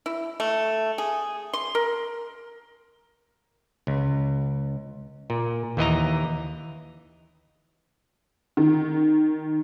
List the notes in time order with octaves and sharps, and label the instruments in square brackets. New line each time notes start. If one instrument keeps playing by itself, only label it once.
[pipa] E4
A3
G#4
C6
A#4
[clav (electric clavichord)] C#2
A#2
D#2 E3 D#5 A#5
[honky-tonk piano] D#3